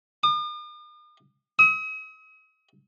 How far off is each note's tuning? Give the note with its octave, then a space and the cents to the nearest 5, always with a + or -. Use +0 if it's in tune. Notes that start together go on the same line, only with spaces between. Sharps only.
D#6 -45
D#6 +45